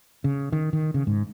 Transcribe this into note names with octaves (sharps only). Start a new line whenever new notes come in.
C#3
D#3
D#3
C#3
G#2